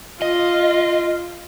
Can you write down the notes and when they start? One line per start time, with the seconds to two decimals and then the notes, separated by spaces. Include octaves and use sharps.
0.22 F4 D#5